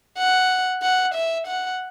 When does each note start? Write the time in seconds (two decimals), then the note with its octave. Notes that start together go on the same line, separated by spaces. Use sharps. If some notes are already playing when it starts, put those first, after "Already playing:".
0.18 F#5
0.82 F#5
1.14 E5
1.47 F#5